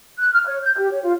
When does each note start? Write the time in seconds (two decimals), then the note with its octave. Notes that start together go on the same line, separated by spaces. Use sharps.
0.19 F#6
0.33 F6
0.47 C#5
0.63 G6
0.78 G4
0.92 C#5
1.03 F4